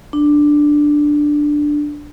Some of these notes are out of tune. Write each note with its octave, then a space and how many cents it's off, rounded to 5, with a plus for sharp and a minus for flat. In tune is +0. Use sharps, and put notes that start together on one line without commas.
D4 +5